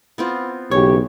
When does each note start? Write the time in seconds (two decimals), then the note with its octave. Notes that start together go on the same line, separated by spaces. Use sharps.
0.18 B3 C4 F4
0.71 B1 C#3 E3 G4 C#5